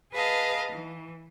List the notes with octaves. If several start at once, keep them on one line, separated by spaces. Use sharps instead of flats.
G#4 B4 D#5 F5 A5
E3